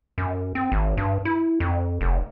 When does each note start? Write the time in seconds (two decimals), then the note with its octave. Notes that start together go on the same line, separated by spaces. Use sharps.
0.18 F#2
0.55 C4
0.72 G#1
0.97 G2
1.25 E4
1.60 F2
2.01 F1